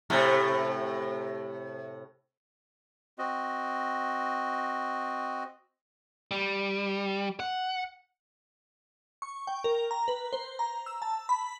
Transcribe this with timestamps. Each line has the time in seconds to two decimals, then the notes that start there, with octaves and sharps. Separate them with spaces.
0.10 A2 C3 A3
3.19 C4 F#4 D#5
6.31 G3
7.40 F#5
9.22 C#6
9.47 G5
9.64 A#4
9.91 A#5
10.08 B4
10.33 C5
10.59 A#5
10.86 E6
11.02 A5
11.29 B5